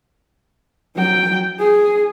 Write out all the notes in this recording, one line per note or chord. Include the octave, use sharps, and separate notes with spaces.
F#3 G5
G#4